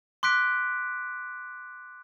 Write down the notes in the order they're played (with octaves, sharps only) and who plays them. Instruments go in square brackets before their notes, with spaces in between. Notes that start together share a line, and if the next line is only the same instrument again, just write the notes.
[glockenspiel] C6 D6 F#6 B6 D7